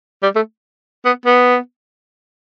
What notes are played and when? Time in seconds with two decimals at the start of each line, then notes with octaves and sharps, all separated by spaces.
0.23 G3
0.36 A3
1.05 B3
1.26 B3